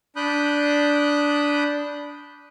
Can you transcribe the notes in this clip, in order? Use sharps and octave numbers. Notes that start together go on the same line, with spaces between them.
D4 B5 D#6 F#6 G6